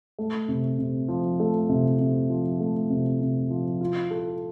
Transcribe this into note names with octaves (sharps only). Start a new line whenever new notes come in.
A3
C3
C3
F3
A3
C3
C3
F3
A3
C3
C3
F3
F4
A4